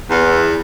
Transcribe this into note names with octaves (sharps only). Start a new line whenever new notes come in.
E2